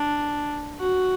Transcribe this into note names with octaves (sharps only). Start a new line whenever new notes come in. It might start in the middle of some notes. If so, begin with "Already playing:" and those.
Already playing: D4
F#4